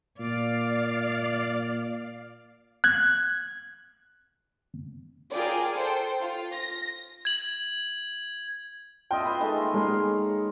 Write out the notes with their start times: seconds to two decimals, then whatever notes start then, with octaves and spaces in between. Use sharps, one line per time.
0.20 A#2 D5 F5
2.84 F#6 G#6
5.33 F4 G#4 A#4 D5 G5
5.74 A4 C5 G5
6.20 F4
6.51 A#6
7.25 G#6 F#7
9.11 F4 D#5 E5 G5
9.23 B4 B5 C6
9.40 D#3 G#3 A3
9.58 A#3
9.74 G#3 G#4 A#4
10.08 C#5